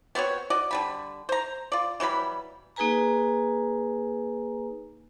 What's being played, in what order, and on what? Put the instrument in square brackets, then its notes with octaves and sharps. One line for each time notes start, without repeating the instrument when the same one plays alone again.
[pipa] B3 C4 F#4 C#5
F#4 D5 D#5
D3 G3 B5
C5 A#5
F4 D5
E3 F#3 G3 B5
[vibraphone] A#3 D#4 G#4 B4 G#5 A#5